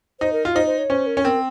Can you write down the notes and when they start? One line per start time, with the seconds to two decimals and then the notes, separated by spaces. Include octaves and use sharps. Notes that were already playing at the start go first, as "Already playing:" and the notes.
0.20 D#4 C5
0.33 A#4
0.45 F4
0.55 D#4 C5
0.66 C5
0.78 C#5
0.90 C#4 C5
1.07 A#4
1.17 C#4
1.24 C4 A#4